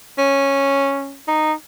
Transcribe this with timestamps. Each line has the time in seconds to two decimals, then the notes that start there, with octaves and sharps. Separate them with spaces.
0.18 C#4
1.28 D#4